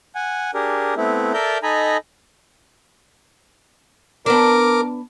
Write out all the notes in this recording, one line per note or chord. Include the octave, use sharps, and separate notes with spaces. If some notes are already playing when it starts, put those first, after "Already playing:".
F#5 G#5
D4 G4 G#4 A#4
A3 B3 C4 E4
A4 A#4 D5 E5 A#5 G6
D#4 A4 D#5 G#5 A#5 B5
B3 D4 A#4 D6